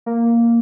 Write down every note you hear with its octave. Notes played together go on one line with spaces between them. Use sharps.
A#3